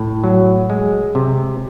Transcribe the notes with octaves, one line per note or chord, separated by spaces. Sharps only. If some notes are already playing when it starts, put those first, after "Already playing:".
Already playing: A2
F#3
G#3
C3